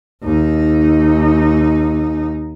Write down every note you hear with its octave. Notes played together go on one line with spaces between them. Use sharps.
D#2 D#4